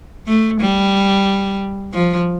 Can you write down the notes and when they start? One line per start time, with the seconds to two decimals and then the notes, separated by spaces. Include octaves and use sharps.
0.27 A3
0.61 G3
1.94 F3